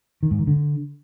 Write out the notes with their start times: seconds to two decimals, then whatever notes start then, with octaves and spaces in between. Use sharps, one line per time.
0.23 D#3
0.31 G#2
0.39 D#3
0.47 D3